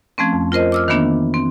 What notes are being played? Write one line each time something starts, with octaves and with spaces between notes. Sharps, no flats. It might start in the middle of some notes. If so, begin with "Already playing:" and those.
F3 A3 C4 C#4
F2
F4 A#4 C5 D#5
D6 E6 F6
D#3 E3 A#3 B3 D4
C4